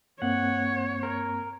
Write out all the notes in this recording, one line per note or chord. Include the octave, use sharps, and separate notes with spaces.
G2 A#3 C4 C#5 F#5
A#4